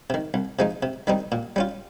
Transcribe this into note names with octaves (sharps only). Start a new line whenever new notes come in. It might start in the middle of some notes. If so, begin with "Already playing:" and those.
C3 D#3
C2
C3 F3 G#3 D#4
C3
D#3 G3 C4 D#4
A#2
G3 C#4 F4